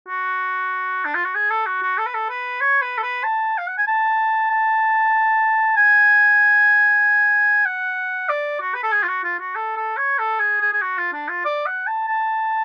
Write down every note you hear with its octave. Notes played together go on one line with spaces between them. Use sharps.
F#4
D4
F4
F#4
G#4
A4
F#4
F#4
A4
B4
A4
B4
C#5
B4
A4
B4
A5
F5
F#5
G#5
A5
A5
G#5
F#5
D5
F#4
B4
A4
G#4
F4
F#4
F4
F#4
A4
A4
C#5
A4
G#4
G#4
G#4
F#4
F4
D4
F4
D5
F#5
A5
A5